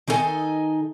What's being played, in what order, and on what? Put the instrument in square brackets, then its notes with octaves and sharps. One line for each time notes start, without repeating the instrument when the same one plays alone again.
[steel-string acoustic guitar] D#3 D#4 E4 A4 D#5 G#5